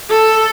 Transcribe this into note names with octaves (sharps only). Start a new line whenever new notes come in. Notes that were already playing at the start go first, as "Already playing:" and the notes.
A4